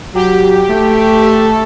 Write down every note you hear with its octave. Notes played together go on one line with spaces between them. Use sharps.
F#3 G4
A3
A4
A4